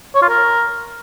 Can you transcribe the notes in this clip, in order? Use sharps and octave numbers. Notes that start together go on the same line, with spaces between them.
C#5
F4
A#4